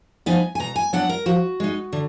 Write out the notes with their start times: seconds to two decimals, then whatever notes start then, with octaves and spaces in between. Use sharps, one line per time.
0.26 F3 B3 D#4 G#5
0.55 G#5
0.60 B2 A#5
0.76 G#5
0.93 F#3 B3 D4 F#5
1.09 A#4
1.26 F3 F#4
1.60 G#3 D#4
1.93 D3